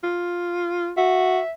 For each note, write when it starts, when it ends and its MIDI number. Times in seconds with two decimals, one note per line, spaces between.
0.03 0.92 65
0.97 1.39 66
0.97 1.52 76